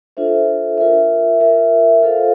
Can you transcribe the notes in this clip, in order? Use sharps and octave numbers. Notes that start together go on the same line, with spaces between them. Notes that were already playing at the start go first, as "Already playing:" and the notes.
D4 F4 A4 C5 E5
F4 A#4 E5
F4 A#4 E5
F4 A4 C5 F5